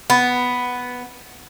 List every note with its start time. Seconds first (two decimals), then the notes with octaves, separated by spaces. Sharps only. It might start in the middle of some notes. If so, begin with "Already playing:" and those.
0.10 B3